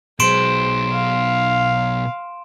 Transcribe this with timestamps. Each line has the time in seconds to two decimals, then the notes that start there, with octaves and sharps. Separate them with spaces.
0.20 B2 F#3 G#3 C5 C6 D7 E7
0.92 F5